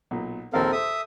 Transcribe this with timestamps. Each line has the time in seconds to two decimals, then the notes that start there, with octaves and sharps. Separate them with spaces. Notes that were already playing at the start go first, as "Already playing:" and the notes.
0.11 B1 A#2
0.53 A#1 D#2 C4 A4 A#4 F5
0.72 A4 C5 E5 D#6